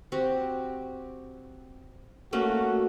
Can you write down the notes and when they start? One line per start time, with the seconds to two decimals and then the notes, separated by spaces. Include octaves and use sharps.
0.12 C4 F#4 G4
2.33 A3 A#3 C#4 F#4